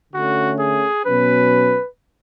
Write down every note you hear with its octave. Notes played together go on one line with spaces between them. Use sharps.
D3 A3 C#4 F#4
G#4
B2 F#3 C#4 B4